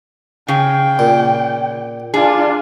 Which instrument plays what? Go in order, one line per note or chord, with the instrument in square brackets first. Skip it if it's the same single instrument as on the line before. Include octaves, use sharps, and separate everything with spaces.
[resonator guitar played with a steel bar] C#3 G#4 [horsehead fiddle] G5
[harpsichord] A#2
[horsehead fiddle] D4 F4 [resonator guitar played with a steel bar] G#4